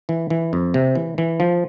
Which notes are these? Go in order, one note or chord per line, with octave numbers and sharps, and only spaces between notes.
E3
E3
F2
C3
E3
E3
F3